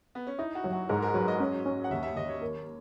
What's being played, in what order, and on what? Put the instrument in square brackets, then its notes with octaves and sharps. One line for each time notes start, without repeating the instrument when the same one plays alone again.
[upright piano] B3
C#4
[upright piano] D#4 [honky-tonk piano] E4
[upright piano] F#4
[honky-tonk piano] F#3
[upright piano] F#4
[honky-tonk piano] G#2 [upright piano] A#4
[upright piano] A#4
[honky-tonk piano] F#3 [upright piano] B4
[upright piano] D#5
[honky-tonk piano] C#4
C#4
[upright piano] F#5
[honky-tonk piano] D#2 [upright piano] E5
[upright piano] E5
[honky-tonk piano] D#2 [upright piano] D#5
[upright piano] C#5
[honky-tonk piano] A#4